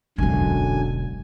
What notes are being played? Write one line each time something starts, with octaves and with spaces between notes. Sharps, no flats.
E1 B1 F#2 D3 G#5